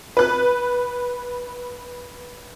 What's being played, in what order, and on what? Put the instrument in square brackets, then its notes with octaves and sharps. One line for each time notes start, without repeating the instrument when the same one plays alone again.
[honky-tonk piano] B4 F#6